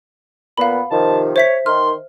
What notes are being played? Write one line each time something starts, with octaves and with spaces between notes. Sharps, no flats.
A#2 B3 F5 B5
C3 D#3 F3 A5
C5 C#5 E5 B6
D#3 C6 F6